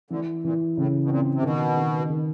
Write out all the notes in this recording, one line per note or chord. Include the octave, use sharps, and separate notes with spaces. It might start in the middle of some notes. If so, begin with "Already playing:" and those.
D2 D3 E3
A#2 E3
A2 C#3
B2
A#2 C4
C3
B2 D#3
D#3
D#3